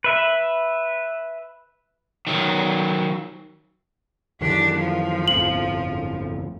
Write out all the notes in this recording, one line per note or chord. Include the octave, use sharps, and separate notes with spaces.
B4 E5
D#3 F#3
F#2 D#3 E3 D4 G4
F3
G1 F2 A2 F#7